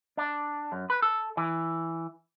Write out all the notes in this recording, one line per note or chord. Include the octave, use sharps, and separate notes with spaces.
D4
F#2
B4
A4
E3